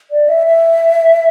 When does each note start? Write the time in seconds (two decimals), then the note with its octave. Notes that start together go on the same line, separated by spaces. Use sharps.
0.11 D5
0.29 E5
0.47 E5